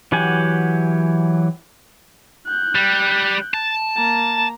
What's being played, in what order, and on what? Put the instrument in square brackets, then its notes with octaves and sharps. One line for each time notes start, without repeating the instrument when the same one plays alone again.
[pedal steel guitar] E3 F#3 G4 F#5 G#5
[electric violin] F#6 G6
[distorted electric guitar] G3
A5
[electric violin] A#3 A#5